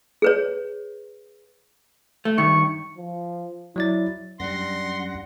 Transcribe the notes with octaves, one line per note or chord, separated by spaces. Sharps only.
G#4 B4 C#5
A3
G2 D#3 C#6
F3
F#3 E4 D5 A6
F#2 G3 D4 F#5 C6 A#6